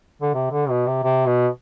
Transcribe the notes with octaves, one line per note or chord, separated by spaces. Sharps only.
D3
C3
D3
B2
C3
C3
B2